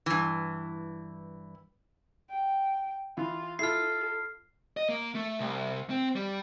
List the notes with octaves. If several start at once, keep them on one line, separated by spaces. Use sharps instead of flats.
G2 E3
G5
E3 F4
E4 F4 A4 F6 C7
D#5
A#3
A3
C2
C4
G3